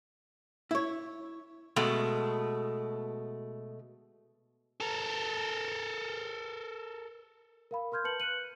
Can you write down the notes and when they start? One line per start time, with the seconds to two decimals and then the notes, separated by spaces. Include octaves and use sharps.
0.71 E4 C#5
1.76 B2 G#3 A3
4.81 A4 A#4
7.71 A#4 F5 B5
7.92 A#4 C6 F6 G6 G#6
8.04 B4 A5 G6 C#7 F#7
8.20 F#6 G6 C#7 D#7 F#7